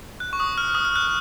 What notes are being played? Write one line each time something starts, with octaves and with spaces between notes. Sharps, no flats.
F#6
C#6
D#6
F6
D#6
F6
F#6